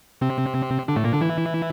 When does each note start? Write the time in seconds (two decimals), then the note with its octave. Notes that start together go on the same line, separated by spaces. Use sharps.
0.21 C3 C4
0.88 D3 D4
0.96 A2 A3
1.04 A#2 A#3
1.13 D3 D4
1.21 E3 E4